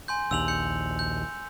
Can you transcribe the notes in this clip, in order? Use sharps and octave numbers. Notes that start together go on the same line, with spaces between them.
G#5 C6 G6
A#1 D#2 E6 F7 F#7
G6 C#7
G6